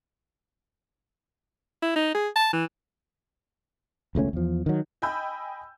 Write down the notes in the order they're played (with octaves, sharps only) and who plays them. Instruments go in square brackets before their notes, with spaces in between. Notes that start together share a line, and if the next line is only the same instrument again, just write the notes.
[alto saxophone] E4
D#4
G#4
A5
E3
[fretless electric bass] E1 C#2 A3 C#4
E2 F3
D#3 F#3
[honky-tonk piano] D#5 G5 G#5 B5 E6 G6